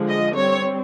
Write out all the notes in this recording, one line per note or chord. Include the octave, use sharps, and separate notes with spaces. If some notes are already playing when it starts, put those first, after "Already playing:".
Already playing: D3 F3 G#3
D#5
G3 C4 C#5